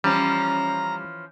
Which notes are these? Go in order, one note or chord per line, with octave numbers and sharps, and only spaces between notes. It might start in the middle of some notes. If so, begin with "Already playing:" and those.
E3 F3 G3 C#4 A#5